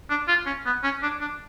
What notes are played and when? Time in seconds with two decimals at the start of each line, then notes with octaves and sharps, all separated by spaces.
0.10 D4
0.28 F4
0.46 C#4
0.66 B3
0.84 C#4
1.03 D4
1.21 D4